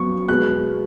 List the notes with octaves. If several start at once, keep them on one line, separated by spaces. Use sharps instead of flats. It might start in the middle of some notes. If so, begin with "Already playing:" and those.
Already playing: F#2 F#3 B3 C#6
B2 G#3 B3 F#6